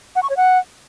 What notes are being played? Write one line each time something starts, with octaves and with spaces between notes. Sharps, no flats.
F#5
C#6
C#5
F#5